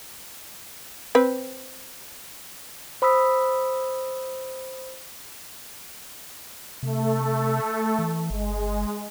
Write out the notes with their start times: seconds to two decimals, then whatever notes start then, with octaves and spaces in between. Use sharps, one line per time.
1.15 C4 B4
3.02 C5 B5 D#6 E6 B6
6.83 C3 A3 A4
7.99 E3
8.30 G1 G#3